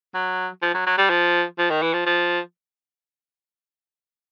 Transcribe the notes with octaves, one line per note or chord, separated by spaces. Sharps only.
F#3
F3
F#3
F#3
G3
F3
F3
D#3
E3
F3
F3